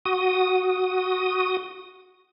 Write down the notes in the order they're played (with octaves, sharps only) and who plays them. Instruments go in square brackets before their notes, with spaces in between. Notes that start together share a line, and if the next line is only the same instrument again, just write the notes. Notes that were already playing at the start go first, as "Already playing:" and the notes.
[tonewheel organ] F#4 D#6